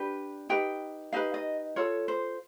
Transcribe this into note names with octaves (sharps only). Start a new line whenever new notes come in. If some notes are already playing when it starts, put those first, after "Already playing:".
Already playing: D4 G4 B4
D#4 G4 B4 G5
D#4 G4 B4 F5
D#5
F4 A4 C#5
C5